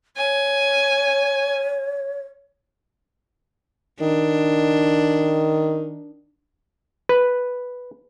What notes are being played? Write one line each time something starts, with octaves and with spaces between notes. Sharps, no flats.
C#5 G#5
D#3 D4
B4